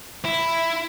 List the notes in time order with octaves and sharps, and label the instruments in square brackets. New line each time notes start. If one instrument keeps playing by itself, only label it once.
[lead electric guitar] E4